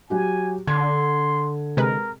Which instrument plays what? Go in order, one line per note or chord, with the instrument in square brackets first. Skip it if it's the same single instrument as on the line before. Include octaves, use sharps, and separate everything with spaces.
[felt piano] F#3 F#4 G4 [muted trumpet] G#5
[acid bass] D3 [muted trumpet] C6 [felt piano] G#6
[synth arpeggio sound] C3 G#3 B4 [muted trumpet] A#4